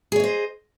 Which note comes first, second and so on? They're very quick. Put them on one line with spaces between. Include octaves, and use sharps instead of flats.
G#4 C#5 D#5 C5